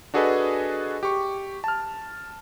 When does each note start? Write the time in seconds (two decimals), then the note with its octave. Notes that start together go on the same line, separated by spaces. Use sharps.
0.14 D4 F#4 G#4 A4 B4 D#5
1.03 G4 C#6
1.64 A5 F6